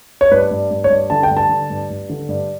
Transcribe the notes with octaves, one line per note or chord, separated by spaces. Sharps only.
C#5
G2 B4
G2
G2
C#5
G2
D3 A5
G5
G2
A5
D3
G2
G2
D3
G2